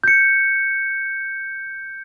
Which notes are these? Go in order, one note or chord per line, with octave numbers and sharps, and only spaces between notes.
G6 C#7